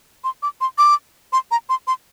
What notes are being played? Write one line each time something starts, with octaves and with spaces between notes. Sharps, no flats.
C6
D6
C6
D6
C6
A#5
C6
C6